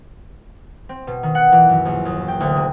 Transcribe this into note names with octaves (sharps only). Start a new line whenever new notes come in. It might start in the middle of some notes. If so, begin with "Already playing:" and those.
C4
B2
D#3
F#5
E3
F#2
A#1
D#2
G5
D2
C3